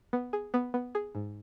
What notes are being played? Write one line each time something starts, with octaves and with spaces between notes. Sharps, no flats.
B3
G#4
B3
B3
G#4
G#2